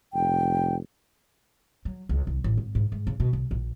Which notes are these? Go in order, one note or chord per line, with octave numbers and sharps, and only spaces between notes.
F1 G5
F#3
C#2
C2
A1
G#1
G#2
G#2
C#3
B2
B1
A#1